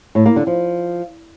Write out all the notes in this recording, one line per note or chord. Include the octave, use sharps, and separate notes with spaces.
A2
A#3
D3
F3